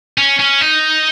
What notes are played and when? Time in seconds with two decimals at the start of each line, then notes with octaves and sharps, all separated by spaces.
0.18 C#4
0.39 C#4
0.61 D#4